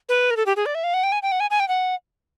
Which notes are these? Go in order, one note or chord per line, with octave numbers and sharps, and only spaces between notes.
B4
A#4
A4
G4
G#4
D5
E5
F5
F#5
G5
G#5
G5
F#5
G#5
G#5
G5
F#5